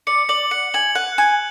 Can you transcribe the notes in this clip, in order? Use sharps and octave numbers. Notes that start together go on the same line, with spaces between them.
D5 C#7
D5 F#7
F#5 C#7
G#5 F#7
F#5 F#6
G#5 F#6